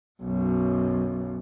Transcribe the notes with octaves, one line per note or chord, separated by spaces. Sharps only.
B1 F#2